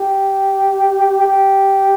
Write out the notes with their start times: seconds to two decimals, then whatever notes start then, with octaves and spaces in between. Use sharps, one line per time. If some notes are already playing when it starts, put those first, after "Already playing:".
Already playing: G4
1.26 G4